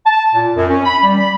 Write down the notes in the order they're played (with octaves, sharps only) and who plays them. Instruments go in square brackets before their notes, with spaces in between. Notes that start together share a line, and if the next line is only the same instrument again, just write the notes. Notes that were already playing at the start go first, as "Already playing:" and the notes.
[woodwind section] A5
A#2
F#2
C#4
B5
G3
B5